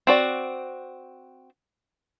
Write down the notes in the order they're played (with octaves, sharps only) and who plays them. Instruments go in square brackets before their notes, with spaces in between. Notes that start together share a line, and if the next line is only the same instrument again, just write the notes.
[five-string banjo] C4 F#4 D5